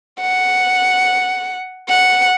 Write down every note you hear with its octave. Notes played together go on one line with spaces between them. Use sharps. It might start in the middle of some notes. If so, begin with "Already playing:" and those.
F#5
F#5